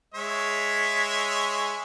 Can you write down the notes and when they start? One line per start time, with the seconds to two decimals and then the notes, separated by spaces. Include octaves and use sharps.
0.14 G#3 C#5 E5